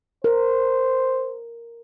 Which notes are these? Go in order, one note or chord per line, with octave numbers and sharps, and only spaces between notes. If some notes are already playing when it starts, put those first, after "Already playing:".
A#4 C5